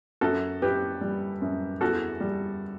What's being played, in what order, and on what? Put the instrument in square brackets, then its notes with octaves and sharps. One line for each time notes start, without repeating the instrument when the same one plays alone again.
[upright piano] F#2 F#4 A4
F#2 G4 B4
G3
F#2
E2 F#4 A4
G3